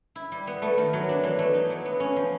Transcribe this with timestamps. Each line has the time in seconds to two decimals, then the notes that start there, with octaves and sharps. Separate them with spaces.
0.15 E4
0.32 G3
0.47 B3
0.62 A3
0.78 D#3
0.93 F#3
1.09 D4
1.23 E3
1.39 A3
1.54 D#4
1.70 F#3
1.86 B3
2.00 C#4
2.16 F3